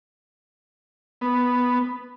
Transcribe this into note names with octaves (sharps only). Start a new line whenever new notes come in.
B3